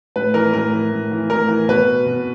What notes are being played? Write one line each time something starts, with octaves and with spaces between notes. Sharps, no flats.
A2 B4
E3 A#4
A2 A#4
E3
A2
E3
A2 A#4
E3
B2 B4
B2